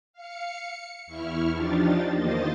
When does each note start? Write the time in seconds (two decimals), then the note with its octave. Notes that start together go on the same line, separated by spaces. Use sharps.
0.13 F5 C#7
0.62 C#7
1.07 E2 E4 C#6 F6
1.53 F3 D4 D#4 F4 G4 A6
2.12 E2 D#3 A#3 C5 D#5 A6